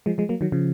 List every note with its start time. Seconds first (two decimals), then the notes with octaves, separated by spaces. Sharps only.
0.06 F3 G#3
0.18 F3 G#3
0.29 F#3 A#3
0.41 D#3 F#3
0.52 C#3 F3